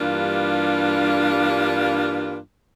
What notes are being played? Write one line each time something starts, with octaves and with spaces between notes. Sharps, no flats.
G2 E3 G3 A#3 D4 F4